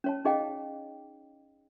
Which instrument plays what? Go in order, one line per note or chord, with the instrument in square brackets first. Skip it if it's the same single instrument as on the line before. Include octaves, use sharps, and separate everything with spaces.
[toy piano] C#4 C#5 A5
C#4 D#4 G#4 D#5 F5 G5